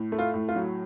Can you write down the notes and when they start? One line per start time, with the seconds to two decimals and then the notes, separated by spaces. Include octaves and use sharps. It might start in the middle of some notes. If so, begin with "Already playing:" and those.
Already playing: A2
0.12 A3
0.19 F4
0.34 A2
0.49 F4
0.56 F#3